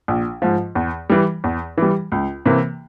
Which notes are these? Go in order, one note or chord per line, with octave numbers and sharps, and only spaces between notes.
A#1
G#2 F3
E2
E3 G3
E2
E3 G3
C#2
C3 E3 A#3